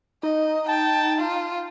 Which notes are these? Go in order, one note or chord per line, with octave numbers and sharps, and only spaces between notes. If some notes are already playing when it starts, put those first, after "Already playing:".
D#4 D#5
G5 A5
F4